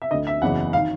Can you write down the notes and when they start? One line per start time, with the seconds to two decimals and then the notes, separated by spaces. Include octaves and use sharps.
0.02 E5
0.11 D2 D3 D#5
0.27 E5
0.42 F#1 E2 C#3 E3 F#5
0.73 F5
0.76 D#3